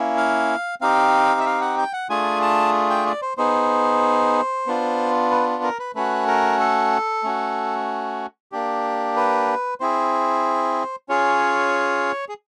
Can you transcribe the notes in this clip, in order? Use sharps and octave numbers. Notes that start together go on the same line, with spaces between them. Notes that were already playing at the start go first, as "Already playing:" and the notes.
Already playing: A#3 C#4 E4
F5
C4 D#4 G4 F5
E5
F5
F#5
G5
F#5
A3 D4 F4 G#4 G#5
A5
G5
D5
C5
B3 D#4 G#4 C5
B3 D4 F4
B4
A#4
B4
A3 C#4 F#4 B4
A#4
A4
A3 C#4 F#4
A#3 D4 G4
B4
C4 E4 G#4 C5
C#4 F4 G#4 C#5
G#4